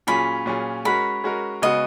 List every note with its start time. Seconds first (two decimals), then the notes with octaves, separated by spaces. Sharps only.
0.07 A#2 F#3 C#4 F4 G#4 B5
0.46 A#2 F#3 C#4 F4 G#4
0.85 G#3 C#4 F#4 A#4 B5
1.24 G#3 C#4 F#4 A#4
1.62 C#3 G#3 B3 F#4 D#5